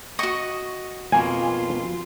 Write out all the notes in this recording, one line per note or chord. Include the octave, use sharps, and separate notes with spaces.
F#4 D#5 C#6
F2 B2 A#3 F4 G#5